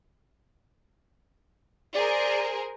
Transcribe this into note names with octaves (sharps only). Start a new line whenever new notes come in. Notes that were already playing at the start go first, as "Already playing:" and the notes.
G#4 A#4 C5 D5